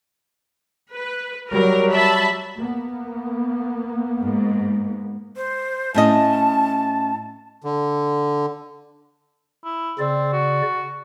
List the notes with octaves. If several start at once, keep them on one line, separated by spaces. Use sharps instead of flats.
B4
F#3 G3 A#4
E5 A5 B5
A#3 B3
G#2
C5
A2 C#4 D#5 A5
D3
E4
C#3 C4 D5
F#4